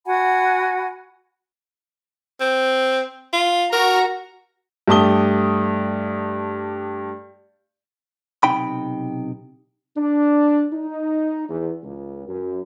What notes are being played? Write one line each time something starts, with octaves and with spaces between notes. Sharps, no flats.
F#4 F#5 G#5 B5
C4
F4
F#4 A#4 A#5
G2 A3 G4 A5 D#6 G7
B1 F2 C3 D#4 G5 B5
D4
D#4
E2
C#2
F#2